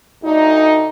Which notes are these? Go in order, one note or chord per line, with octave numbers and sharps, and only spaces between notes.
D2 D#4